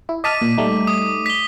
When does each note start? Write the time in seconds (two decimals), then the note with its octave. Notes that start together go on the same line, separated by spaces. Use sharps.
0.09 E4
0.24 D#5 A5 D6 F6 B6 D#7
0.41 A#2
0.58 G3 A3 D#4
0.87 D#6
1.26 B6 G7